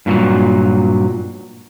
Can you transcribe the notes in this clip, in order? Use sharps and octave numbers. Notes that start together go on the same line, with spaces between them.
G2 A#2 E3 F#3